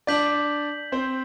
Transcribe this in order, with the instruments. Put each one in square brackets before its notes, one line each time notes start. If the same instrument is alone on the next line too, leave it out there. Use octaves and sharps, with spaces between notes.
[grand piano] D4 D5 [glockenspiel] G6 B6 F#7
[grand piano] C4 C5